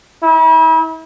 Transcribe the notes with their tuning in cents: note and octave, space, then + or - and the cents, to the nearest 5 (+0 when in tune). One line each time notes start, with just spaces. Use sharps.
E4 -40